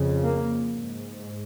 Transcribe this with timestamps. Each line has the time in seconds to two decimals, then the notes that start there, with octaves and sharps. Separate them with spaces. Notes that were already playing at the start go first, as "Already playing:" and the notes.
Already playing: F2 C#3
0.23 A#3
0.78 G#2